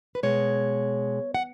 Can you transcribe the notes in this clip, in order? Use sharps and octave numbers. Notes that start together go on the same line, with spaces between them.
B4
B2 G#3 C#5
F#5